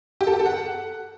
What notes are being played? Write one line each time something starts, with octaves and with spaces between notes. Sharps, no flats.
G4
A4
G4
A4
F#5